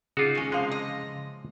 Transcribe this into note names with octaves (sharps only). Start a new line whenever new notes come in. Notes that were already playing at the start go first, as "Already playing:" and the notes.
C#3 D#4 F4 F#4 G#4 D6
G#3 C#4
C3 E3 F3 G#3 F5
D#5